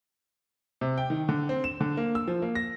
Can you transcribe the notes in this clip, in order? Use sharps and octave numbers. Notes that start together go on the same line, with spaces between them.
C3
G5
D#3
D3
C4
E7
D3
A#3
E6
F3
A#3
A#6